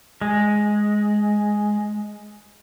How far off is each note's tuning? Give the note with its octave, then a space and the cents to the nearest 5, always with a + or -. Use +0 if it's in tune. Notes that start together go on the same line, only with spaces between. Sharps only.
G#3 +5